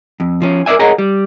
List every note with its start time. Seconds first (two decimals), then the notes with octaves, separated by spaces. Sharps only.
0.20 F2
0.42 F3 C#4
0.66 A#4 B4 D5 E5 G#5
0.79 G#4 A#4 C#5 D#5 F#5 A#5
0.98 G3